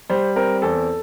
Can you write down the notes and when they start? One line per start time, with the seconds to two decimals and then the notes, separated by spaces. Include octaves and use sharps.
0.10 G3 C5
0.36 C4 A#4
0.62 E2 A4